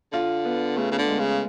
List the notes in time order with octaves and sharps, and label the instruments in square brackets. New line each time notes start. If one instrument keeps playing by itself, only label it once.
[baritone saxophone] D3 [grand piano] F4
[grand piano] B3
[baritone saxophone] C#3 [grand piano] A3
[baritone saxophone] C#3
D3
[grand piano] G#3
[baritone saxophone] C#3